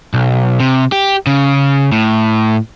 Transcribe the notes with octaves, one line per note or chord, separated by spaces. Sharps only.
B1
C3
G4
C#3
A2